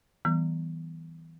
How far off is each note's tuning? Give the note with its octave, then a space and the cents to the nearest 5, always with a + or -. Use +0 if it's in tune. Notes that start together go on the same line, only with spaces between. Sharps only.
E3 -20 G3 -40 B3 +0